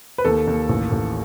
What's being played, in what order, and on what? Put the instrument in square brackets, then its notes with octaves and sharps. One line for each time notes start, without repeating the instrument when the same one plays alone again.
[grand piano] B4
D#2 A4
D#2
A1
A1